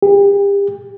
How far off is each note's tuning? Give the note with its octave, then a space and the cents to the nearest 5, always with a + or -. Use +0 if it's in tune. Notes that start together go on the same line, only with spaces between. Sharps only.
G4 +35